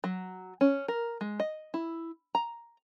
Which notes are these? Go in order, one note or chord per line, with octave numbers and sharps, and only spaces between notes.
F#3
C#4
A#4
G#3
D#5
E4
A#5